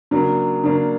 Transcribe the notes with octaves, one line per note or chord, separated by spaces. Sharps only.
C#3 F#3 A#3 D4
C#3 F#3 A#3 D4